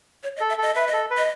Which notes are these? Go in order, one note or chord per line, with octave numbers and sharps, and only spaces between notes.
C#5
D#5
A4
E5
A4 D#5
B4 E5
D#5
A4
B4
D#5